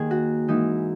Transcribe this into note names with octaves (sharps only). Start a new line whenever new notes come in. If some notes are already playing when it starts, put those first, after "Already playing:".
Already playing: D#2 D#3 A#3 G#4
F#4
G#2 E3 A#3 D#4